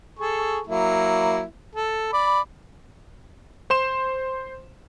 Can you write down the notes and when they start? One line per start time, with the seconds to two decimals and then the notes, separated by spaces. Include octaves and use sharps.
0.19 G#4 A4 C#6
0.67 F#3 A#3 E4
1.75 A4
2.13 D5 B5
3.70 C5 C6 E7